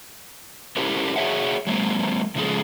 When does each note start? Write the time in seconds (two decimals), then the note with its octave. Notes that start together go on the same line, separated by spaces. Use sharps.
0.77 C#4 E4 G4 A4 A#4 C5
1.16 F#4 G#4 B4 C#5 E5 F#5
1.67 F#3 G#3 A#3 C4
2.35 C#3 F3 G#3 A#3 G#4 A4